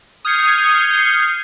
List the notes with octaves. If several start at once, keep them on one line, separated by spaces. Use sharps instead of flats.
D#6 F6 G6 G#6 C7 C#7